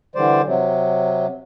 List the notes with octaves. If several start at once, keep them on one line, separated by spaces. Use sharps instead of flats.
D3 E3 G3 C5 D5
C3 F#3